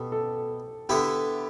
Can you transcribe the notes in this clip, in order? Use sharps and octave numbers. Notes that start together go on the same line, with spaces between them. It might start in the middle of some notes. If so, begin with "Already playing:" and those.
Already playing: B2 G4 A4
A4
D3 B3 E4 G4